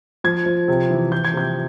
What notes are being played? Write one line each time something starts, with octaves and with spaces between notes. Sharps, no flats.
F3 G#6
F3
C3
E3
F3 G6
G#6
C3 G6